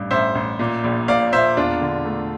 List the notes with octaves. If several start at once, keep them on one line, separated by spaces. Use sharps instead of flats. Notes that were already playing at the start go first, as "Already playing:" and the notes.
Already playing: A1 G2
A1 C5 E5
A1
A#2
A#1
A#2 D5 F5
A#2 C5 E5
E1 D4 F4
D3
A3